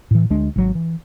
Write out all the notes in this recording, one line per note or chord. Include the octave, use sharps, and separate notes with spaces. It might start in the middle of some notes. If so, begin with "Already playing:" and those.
A2 E3
D2 G#3 D4
G#1 F#3
E3